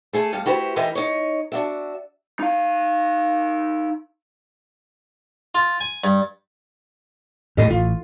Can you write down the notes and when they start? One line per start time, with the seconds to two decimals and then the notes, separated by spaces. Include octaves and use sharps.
0.13 A3 G#4 A4
0.33 F2 G3 F5
0.46 E4 F#4 G4 B4 C5
0.76 E3 D#4 A#4 B4 E5 G5
0.95 D#4 C#5
1.52 D4 F#4 E5
2.40 D#4 F5
5.55 F4
5.81 G#5
6.04 G2
7.57 D2 A2 F3 G4 A4 D#5
7.70 A1 F4